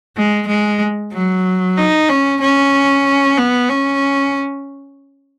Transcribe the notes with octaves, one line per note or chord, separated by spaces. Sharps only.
G#3
G#3
F#3
D#4
C#4
C#4
B3
C#4